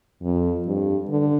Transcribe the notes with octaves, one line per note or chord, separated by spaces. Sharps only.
F2
G2
D3